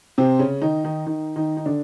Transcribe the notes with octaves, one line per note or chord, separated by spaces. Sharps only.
C3 C4
C#3 C#4
D#3 D#4
D#3 D#4
D#3 D#4
D#3 D#4
D#4
D3 D4